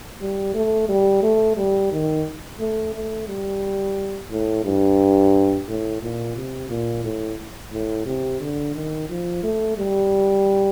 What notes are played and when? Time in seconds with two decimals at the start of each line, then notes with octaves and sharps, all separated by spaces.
0.21 G3
0.54 A3
0.89 G3
1.23 A3
1.57 G3
1.92 D#3
2.60 A3
2.94 A3
3.28 G3
4.31 A2
4.65 G2
5.68 A2
6.02 A#2
6.36 C3
6.69 A#2
7.04 A2
7.73 A2
8.06 C3
8.41 D3
8.74 D#3
9.09 F3
9.44 A3
9.78 G3